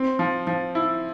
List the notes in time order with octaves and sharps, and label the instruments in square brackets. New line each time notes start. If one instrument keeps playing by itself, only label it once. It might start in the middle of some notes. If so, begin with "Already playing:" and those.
Already playing: [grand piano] C4
F3
F3
E4